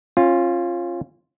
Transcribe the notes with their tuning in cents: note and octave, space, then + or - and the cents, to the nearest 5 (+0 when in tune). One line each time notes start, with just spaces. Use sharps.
C#4 -30 F4 +0